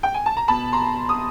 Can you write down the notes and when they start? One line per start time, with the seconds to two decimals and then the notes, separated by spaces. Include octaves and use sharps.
0.03 G5
0.14 G#5
0.26 A5
0.37 A#5
0.48 B2 A5 B5
0.73 A#5 C6
1.09 D#6